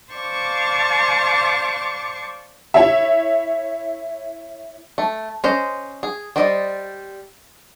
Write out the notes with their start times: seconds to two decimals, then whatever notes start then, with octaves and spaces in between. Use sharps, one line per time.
0.12 C5 D5 F5 A5 C#6 D6
2.74 E4 C#5 E5
4.98 A3
5.44 C#4 C5 D#5
6.03 G#4
6.36 G3 C5 D5 D#5